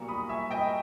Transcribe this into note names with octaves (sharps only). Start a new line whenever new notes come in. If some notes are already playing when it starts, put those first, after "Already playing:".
Already playing: B1 A#2 G3 A#5 C#6
B5 D#6
E5 G#5
D#5 G5